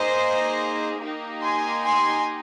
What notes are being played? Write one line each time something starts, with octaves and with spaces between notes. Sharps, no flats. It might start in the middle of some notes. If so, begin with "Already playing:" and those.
Already playing: A#3 D#4 G#4 C5 D#5
A#3 D#4 G4
G#5 C6
G#5 C6